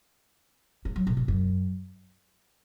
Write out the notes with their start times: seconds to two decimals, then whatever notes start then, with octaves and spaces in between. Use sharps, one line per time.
0.85 G#3
0.96 F#3
1.07 B2
1.17 A#2
1.28 F#2